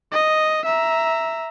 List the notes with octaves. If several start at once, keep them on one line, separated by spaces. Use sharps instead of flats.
D#5
E5 A#5